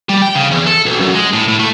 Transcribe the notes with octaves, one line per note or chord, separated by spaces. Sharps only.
G3
G5
C#3
E2
A4
B1
F#2
G#3
A2
A2
A3